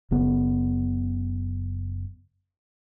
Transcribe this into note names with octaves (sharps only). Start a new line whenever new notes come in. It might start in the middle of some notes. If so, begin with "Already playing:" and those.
F#1 C#3 B3